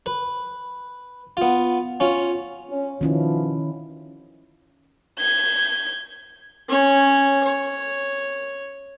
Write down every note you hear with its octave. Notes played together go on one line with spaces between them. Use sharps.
B4
B3 F4
C#4 F4
C#4
B2 D#3 F3 C#4 E4
G6 G#6
C#4 C#5
C#5